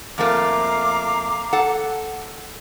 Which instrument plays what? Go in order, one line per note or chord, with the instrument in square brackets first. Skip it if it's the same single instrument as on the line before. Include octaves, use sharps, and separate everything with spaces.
[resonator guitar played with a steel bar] F2 A3 A#3 [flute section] F5 A#5 D6
[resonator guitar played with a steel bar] A4 F#5